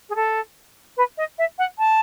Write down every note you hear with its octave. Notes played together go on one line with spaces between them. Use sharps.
G#4
A4
B4
D#5
E5
F#5
A5